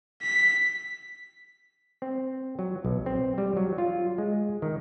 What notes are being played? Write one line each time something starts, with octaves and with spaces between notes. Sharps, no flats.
B6
C4
F#3
B1
C4
G3
F#3
F4
G#3
D#3